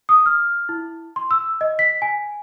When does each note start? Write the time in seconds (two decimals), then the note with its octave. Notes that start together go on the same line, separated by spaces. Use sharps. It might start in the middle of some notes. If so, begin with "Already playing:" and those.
0.09 D#6
0.26 F6
0.69 E4
1.16 C6
1.31 E6
1.61 D#5
1.79 B6
2.02 G#5